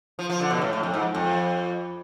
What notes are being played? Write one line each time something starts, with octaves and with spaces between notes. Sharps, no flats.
F3
F3
D3
B2
A2
A2
F2
G#2
F2